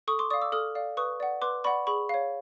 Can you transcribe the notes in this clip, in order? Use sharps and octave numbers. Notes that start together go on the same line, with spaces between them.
A4 C#6 D#6
C6 D6
D5 F5 C#6 D#6
D6 E6
A4 D#6 F6
D5 F5
B4 C#6 D#6
D5 F#5
B4 C6 D6
D5 F#5 B5 C#6
G#4 B5 C#6
C#5 F5